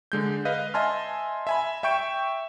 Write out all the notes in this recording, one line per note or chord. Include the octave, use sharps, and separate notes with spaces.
D3 G#3 G6
B4 D#5 F5
D#5 E5 G#5 A5 C6 F6
E5 G#5 B5
E5 G5 C#6 G6 D7 E7